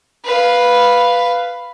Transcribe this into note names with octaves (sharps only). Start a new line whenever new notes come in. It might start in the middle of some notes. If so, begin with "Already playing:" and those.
B4 F5